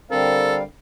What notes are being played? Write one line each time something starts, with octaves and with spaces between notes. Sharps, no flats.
D3 G3 C4 A4 A#4 F5